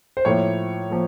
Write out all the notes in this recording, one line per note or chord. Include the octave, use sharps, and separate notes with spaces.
C5
A2 F3 A#3 C#5
F3 A#3